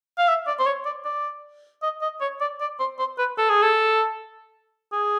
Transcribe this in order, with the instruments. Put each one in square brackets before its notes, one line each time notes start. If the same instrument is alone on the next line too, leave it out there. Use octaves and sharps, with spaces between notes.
[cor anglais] F5
E5
D5
C5
C#5
D5
D5
D#5
D#5
C#5
D5
D5
C5
C5
B4
A4
G#4
A4
G#4